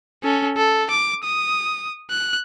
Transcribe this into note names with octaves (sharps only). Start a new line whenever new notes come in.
C#4 A4
A4
D6
D#6
F#6